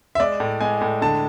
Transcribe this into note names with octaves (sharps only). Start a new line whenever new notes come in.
E5
G#3 D5
A2
G#3 G#5
A2
D3 A5